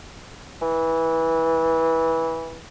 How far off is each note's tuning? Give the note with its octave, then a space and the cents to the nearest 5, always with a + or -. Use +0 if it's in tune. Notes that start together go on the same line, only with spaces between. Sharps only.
E3 -15